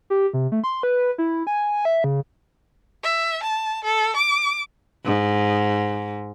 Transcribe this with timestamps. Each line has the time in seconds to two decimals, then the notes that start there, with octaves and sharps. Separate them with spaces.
0.10 G4
0.33 C3
0.52 A3
0.64 C6
0.83 B4
1.18 E4
1.47 G#5
1.85 E5
2.04 C#3
3.03 E5
3.43 A5
3.84 A4
4.16 D6
5.06 G#2